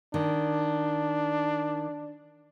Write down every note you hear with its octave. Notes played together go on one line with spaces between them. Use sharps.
D#3 D4